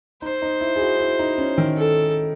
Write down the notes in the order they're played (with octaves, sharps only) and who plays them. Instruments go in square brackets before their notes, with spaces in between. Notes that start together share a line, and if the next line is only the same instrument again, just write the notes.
[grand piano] D#4 [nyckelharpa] C5
[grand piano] D#4
E4
G#4
F#4
E4
D#4
C#4
D#3
[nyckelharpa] A4